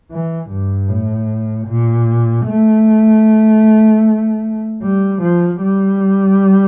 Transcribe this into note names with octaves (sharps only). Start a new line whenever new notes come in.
E3
G2
A2
A#2
A3
G3
F3
G3